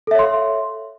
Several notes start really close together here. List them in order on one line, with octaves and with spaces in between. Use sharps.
A4 E5 C#5 C6 F5